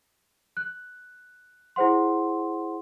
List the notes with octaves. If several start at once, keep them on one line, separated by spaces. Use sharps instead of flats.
F#6
E4 G#4 C5 F#5 C6